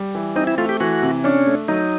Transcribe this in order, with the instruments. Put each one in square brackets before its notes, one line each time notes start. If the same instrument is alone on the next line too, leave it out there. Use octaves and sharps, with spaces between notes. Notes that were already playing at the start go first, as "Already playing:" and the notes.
Already playing: [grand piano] G3
E3
[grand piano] C4 [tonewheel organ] D#4
[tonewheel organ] E4
[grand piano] A3 [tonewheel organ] F4
[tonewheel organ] G4
[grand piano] E3 [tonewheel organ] F#4
[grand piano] C3
[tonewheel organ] C#4 [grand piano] D4
[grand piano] A3
[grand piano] F#3 [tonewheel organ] D#4